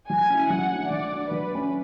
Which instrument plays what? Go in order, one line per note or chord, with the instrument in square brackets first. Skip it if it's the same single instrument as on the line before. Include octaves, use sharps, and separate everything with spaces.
[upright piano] F#3 [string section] G#5
[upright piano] C#4 E4
[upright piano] F#3 [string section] F#5
[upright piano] A3 D4
[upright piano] F#3 [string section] D5
[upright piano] A3 D4
[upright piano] F#3 [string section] B4
[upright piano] A3 C#4